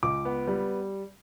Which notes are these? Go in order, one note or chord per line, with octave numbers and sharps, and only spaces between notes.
C#2 D6
B3
G3